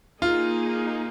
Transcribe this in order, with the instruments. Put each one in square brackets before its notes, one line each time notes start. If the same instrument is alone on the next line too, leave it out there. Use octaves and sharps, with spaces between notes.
[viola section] A#3 D#4 G#4 [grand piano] F4